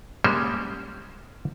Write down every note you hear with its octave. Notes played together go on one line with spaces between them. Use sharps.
G3 G#3 A#3 C#4 C5